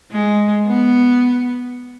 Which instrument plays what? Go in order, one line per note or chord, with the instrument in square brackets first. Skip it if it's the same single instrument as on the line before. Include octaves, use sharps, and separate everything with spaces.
[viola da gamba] G#3
B3